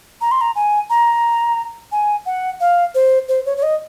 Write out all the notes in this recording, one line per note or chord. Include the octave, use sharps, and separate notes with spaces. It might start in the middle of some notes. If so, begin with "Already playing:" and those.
A#5
C6
A#5
G#5
A#5
G#5
F#5
F5
C5
C5
C#5
C#5
D#5